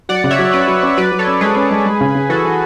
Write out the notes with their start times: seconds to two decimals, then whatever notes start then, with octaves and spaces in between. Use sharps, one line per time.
0.09 F#3 D5 F#5
0.24 C#3
0.31 C#5 E5
0.39 F#3
0.53 C#4 B4 D5
0.68 F#3
0.83 C#4
0.97 F#3 B4 D5
1.12 F#3
1.19 A4 C#5
1.27 C#4
1.41 G#3 G#4 B4
1.56 C#4
1.71 G#3
1.86 G#3
2.01 C#3
2.15 C#3
2.29 E3 F#4 A4
2.44 E3